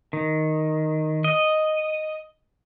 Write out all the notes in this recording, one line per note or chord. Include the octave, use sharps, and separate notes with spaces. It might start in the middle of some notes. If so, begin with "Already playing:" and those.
D#3
D#5